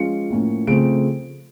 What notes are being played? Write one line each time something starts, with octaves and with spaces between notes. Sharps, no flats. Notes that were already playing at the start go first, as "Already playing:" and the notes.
Already playing: F3 G#3 C#4 F4 C#7
A2 F3 A#3 C#4
C#3 F3 A3 C4 D7